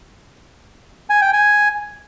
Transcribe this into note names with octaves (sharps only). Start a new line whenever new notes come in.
G#5
G5
G#5